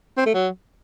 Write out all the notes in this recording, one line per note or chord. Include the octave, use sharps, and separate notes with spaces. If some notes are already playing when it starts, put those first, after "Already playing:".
C4
A3
F#3